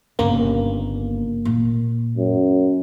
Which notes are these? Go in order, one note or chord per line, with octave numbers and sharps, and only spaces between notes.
G1 C#3 A#3
A#2
F#2